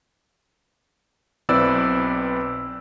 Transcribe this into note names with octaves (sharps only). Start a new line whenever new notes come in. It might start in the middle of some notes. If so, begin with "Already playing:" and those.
B1 C4 E4 B4 D5 E6